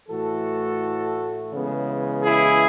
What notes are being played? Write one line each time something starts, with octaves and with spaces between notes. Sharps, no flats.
A2 E3 A3 F#4 A4
C#3 E3 G#3 B3
E4 G#4